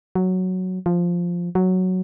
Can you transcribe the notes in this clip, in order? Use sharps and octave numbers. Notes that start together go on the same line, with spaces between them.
F#3
F3
F#3